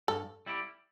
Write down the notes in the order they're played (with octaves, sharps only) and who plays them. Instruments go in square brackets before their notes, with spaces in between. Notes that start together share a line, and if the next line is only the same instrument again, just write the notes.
[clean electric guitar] G2 [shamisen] A4
[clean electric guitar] G3 E4 G4